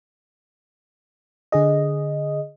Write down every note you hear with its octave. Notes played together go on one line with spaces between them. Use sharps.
D3 G#4 D#5